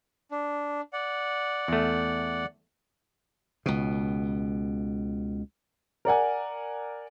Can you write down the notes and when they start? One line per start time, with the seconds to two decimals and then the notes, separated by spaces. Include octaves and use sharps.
0.31 D4
0.93 D5 F#5
1.68 E2 A3
3.66 C#2 B2
6.05 A#4 D5 F#5 G#5